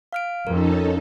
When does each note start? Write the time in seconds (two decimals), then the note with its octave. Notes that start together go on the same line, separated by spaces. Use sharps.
0.13 F5 F6 D7
0.47 F2 C#4 D#4 A4 A#4